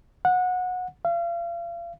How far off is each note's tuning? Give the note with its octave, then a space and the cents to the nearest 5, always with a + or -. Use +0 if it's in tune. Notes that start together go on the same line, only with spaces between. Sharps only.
F#5 -20
F5 -35